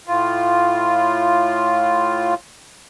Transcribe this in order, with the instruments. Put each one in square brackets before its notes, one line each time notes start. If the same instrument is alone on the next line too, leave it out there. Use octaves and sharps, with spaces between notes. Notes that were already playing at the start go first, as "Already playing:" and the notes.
[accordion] A2 F4